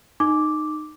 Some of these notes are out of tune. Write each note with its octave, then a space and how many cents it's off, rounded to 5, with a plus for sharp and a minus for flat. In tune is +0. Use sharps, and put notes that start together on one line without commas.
D#4 -20 D6 +0